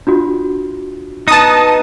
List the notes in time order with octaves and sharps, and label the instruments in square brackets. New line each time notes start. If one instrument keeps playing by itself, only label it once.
[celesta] D4 F4 F#4
[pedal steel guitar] B3 D#4 [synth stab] A5 D#6